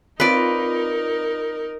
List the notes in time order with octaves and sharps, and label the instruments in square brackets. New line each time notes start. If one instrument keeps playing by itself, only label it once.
[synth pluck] C4 F4 [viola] D#4 A#4 [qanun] B4 D5